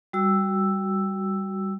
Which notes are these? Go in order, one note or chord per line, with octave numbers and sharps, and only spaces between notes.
G3 F#4 E6